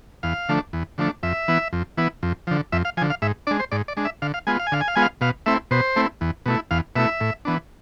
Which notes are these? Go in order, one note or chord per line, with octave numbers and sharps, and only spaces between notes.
E2 F5
D3 F3 A3 D4
E2
D3 F3 A3 D4
F2 E5
E3 B3 E4
F2
E3 B3 E4
F2
D3 F3
F2 E5
F5
D3 F3 G#5
F5
G#2 E5
G#3 D4 D5
C5
G#2 D5
D5
G#3 D4
E5
D3 F5
F5
G#3 B3 F4 G#5
F5
G#5
D3 F5
G#5
F5
G#3 B3 F4 G#5
F5
B2 F5
A3 C4 E4 E5
B2 C5
A3 C4 E4
E2
B2 A3 E4
E2 F5
B2 A3 E4 E5
A2
E3 B3 D4